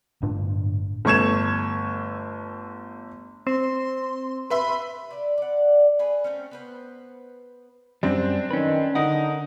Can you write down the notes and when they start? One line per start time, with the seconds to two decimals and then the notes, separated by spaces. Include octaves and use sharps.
0.22 G1 A2 D4
1.05 G1 A3 C#6 G#6 E7
3.47 C4 C6
4.50 B4 E5 B5 C6
5.11 D5 E5
5.38 D5 F#5
5.99 G#4 A4 B4
6.24 A3 C4 C#4
6.51 B3 B4 C5
8.03 F#2 G3 C4 D4
8.51 D#3 C#4 B4
8.95 D3 D#4 A#4 F#5